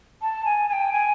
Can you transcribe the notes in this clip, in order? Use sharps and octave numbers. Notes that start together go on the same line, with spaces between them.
A5
G#5
G#5
G5
G#5